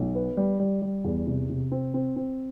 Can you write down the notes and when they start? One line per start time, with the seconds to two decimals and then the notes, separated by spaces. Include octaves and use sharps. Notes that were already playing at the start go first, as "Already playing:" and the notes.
Already playing: B1
0.15 B3
0.37 G3
0.60 G3
0.82 G3
1.04 E2
1.27 C3
1.50 C3
1.72 C4
1.94 C4
2.16 C4